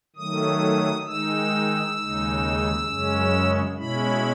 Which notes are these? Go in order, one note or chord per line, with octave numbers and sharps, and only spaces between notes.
D#3 F#3 A3 D#6
D#3 G#3 D#4 E6
D#2 C#3 G#3 D#4
F#2 C#3 G#3 C#4
B2 G#3 C#4 E4 B5